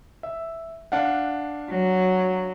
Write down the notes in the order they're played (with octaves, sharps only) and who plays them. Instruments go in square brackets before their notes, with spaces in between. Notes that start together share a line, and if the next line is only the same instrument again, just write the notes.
[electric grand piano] E5
D4 F5 F#5
[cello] F#3